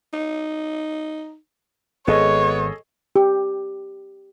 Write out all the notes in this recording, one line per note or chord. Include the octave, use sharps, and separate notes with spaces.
D#4
G#1 B3 G#4 A4 C#5 D#5
G4